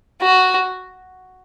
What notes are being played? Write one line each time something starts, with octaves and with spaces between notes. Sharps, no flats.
F#4